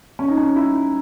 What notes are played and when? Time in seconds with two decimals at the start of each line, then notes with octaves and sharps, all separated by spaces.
0.19 C#4
0.28 D#4
0.38 C#4
0.56 E4